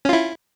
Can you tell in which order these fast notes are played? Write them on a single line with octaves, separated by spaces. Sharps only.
C#4 F4 E4